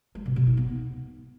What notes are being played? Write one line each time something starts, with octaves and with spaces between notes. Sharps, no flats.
G#3
B2
B2
D#4
B3